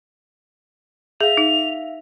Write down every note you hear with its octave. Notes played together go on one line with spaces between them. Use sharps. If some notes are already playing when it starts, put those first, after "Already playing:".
G#4 E5 F5 F7
D#4